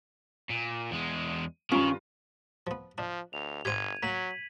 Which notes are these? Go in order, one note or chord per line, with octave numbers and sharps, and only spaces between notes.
A#2
E2 G#3
G2 D#3 C#4 F4
F3 B3
F3 D4
D2 F7
G1 G4 C5 G5 G#6 D#7
F#3 A#3 B6 F#7